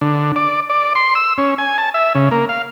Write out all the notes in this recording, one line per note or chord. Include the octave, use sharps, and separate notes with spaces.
D3
D5
D5
C6
E6
C#4
G#5
A5
E5
C#3
A#3
F5